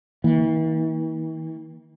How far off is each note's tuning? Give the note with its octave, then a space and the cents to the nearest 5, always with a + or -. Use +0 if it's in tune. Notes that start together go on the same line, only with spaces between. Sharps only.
E3 -45 A#3 +0